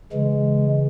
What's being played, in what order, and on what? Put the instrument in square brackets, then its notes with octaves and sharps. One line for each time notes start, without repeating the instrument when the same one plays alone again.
[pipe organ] C#3 E3 G#3